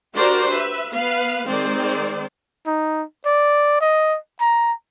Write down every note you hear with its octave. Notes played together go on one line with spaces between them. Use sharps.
D4 F#4 G4 A#4 C5 D5
B4 E5
B3 B4 F5
D#3 G#3 C4 C5 D5
D#4
D5
D#5
A#5